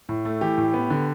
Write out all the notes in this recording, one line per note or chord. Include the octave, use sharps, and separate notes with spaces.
A2
A3
E3 G4
A2
B3
D3